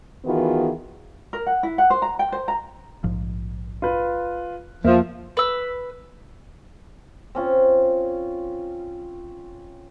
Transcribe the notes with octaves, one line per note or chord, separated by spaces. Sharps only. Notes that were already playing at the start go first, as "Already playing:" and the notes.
D#3 E3 B3 F4 F#4 G#4
A#4
F#5
E4
F#5
C5
A#5
G5
C5
A#5
A#1 G#2 F3
F4 B4
E2 F3 A#3 E5
B4 E6
C4 C#4 F4